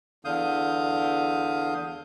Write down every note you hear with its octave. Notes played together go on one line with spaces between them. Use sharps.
E2 D3 F5 D#6 G6